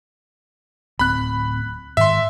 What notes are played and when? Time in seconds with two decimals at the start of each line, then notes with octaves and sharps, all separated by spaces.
0.99 D1 C4 B5 F#6
1.97 G#2 D#3 E5 C6